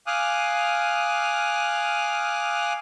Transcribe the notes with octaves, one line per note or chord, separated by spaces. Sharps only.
F5 G#5 D6 D#6 F6 F#6